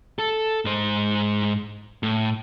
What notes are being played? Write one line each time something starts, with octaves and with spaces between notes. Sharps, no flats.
A4
G#2 C5
A2